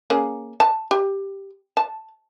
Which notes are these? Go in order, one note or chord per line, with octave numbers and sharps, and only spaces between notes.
A#3 C#4 G#4
A5
G4
A5